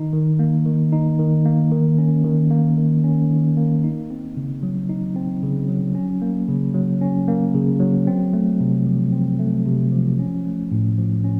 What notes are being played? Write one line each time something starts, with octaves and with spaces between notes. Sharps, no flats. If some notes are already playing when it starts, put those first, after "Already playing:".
Already playing: D#3 D#4
D#3
A#3
D#3
D#4
D#3
A#3
D#3
C#4
D#3
A#3
D#3
C#4
D#3
A#3
D#4
C4
C#3
F#3
D#4
C4
C#3
F#3
C#4
A#3
C#3
F#3
C#4
A#3
C#3
F#3
C4
A3
C3
F3
C4
A3
C3
F3
C#4
A3
A2
F3
C#4